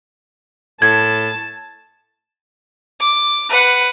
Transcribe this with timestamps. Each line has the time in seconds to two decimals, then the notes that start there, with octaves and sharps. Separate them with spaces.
0.82 A2 A5 G#6
3.00 D6
3.49 B4 F#5